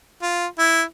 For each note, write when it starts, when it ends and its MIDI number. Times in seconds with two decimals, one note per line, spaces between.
0.22 0.46 65
0.59 0.82 64